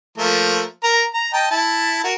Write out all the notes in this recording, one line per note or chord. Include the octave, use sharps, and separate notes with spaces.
F3 A3 A#3
A#4 A#5
A#5
D#5 G5 A5
E4 A5
F#4 A#4